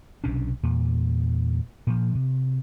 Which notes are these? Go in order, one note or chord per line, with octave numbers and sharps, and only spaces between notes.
B1 C3 C#4 D4
E2 A#2
A#2 F3
C3